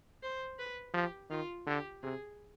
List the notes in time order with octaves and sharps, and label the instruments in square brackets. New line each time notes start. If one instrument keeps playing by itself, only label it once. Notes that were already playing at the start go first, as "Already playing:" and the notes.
[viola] C5
B4
[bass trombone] F3 [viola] G4
[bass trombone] D#3 [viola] F4
[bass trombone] D3 [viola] G4
[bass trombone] C3 [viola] G#4